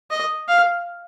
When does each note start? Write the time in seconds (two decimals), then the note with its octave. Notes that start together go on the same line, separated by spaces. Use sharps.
0.10 D#5
0.48 F5